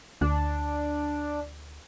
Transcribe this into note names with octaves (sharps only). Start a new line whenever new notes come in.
D2 D4